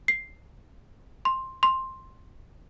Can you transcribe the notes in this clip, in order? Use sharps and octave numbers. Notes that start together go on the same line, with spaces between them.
C7
C6
C6